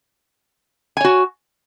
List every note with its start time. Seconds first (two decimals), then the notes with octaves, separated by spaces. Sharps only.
0.97 G#5
1.01 C#5
1.04 F#4